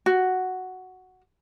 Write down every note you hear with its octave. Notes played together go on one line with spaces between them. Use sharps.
F#4